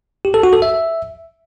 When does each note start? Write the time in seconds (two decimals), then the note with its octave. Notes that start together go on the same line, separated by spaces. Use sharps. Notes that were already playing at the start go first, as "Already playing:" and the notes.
0.25 G4
0.34 A4
0.43 F#4
0.53 A4
0.62 E5